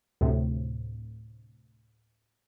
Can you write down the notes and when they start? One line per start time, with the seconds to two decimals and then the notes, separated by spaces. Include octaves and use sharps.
0.21 D2 A2 C3